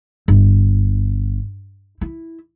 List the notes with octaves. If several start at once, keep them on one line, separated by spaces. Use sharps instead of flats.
G1
E4